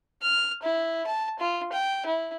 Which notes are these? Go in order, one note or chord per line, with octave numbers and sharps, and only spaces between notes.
F6
E4
A5
F4
G5
E4